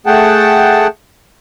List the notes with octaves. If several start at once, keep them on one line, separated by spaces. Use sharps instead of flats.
A3 G#4 F#5 G5 A5